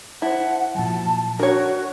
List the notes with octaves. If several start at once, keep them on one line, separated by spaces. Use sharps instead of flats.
E4 C5 F#5 A5
A#2 F3 F#3 A5
D4 F#4 A#4 C#5